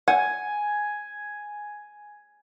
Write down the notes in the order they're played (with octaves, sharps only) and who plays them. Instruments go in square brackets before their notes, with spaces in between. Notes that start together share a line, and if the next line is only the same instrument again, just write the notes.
[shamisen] F#5 [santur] G#5